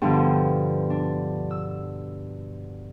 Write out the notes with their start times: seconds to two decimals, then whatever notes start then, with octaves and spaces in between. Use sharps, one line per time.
0.02 G2 B2 D3 F3
0.90 D4
1.51 E6